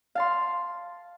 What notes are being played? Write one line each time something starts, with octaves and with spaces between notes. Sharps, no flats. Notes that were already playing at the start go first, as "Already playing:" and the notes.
F5 A5 C6